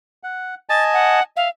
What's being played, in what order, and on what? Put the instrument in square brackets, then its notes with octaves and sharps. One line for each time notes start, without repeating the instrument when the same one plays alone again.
[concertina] F#5
[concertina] D#5 G#5 A5 [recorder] A6
[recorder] F#5
[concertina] E5 [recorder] F5